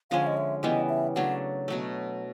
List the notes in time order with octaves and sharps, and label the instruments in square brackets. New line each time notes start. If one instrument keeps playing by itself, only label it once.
[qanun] D3 F3 G#3 C#4 [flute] F5
[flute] D#5
E5
[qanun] C#3 E3 G3 B3 [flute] D#5
[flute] E5
[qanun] C#3 F#3 A3 D4 [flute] F#5
[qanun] B2 F#3 A3